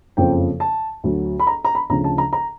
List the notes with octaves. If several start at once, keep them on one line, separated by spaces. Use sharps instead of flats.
F#1 F2 C#3 F3 G5
A5
D2 D3 F#3
B5
A#5
A#5
B5
D2 C#3 F3 A#5
A5
A#5
A#5